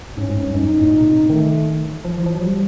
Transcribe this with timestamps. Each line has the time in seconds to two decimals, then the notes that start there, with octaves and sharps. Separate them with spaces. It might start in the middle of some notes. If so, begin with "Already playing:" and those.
0.17 G#2 C#4
0.30 G#2
0.43 G2
0.54 F#2 D#4
0.79 A2
0.92 A#2
1.01 C#3
1.10 C3
1.30 D#3 A3
2.05 F3
2.19 E3
2.26 F3
2.34 F#3
2.42 G3